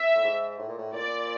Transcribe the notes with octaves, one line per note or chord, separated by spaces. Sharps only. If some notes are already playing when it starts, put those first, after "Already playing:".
Already playing: E5
A2
G#2
A2
A#2
A2
A#2 D5